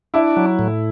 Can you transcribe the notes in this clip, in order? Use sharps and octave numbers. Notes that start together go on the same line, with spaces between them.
D4 E4
F#3
A2